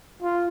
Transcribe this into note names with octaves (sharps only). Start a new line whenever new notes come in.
F4